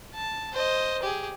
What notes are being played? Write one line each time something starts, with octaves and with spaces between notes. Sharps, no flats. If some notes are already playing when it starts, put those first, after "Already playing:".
A5
C5 D#5
G4 G#4